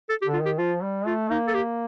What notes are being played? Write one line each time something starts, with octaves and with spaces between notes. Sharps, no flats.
A4
G4
D3
F4
D#3 G4
F3 F4
G3
A3 F4
A#3 D#4
A4
G4